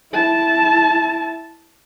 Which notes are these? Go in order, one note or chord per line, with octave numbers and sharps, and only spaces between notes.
E4 A5